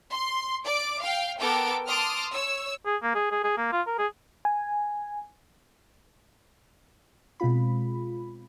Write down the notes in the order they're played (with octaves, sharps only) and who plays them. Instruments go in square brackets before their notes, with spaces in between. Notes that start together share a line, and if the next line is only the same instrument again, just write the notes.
[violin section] C6
D5 D6
F5 G5
B3 A4 A#4 G5 D6
A5 C6 D6 D#6 F6
C#5 E6
[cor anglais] G#4
A#3
G#4
G#4
G#4
A#3
F4
A#4
G#4
[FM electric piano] G#5
[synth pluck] B2 G#3 C4 F4 B5